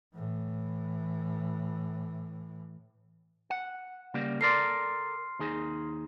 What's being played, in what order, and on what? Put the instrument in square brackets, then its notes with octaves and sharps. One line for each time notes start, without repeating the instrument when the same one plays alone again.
[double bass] A2 E3
[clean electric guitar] F#5
C#3 G3 A#3
[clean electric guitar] A4 A#4 D5 [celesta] C6 F6 C7
[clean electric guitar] D#2 D#4 G#4